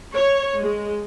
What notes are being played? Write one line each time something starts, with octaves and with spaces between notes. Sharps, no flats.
C#5
G#3